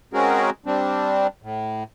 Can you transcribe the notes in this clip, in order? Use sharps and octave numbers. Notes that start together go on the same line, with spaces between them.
G#3 C4 C#4 F#4 G#4 A#4
G3 C4 D4
A2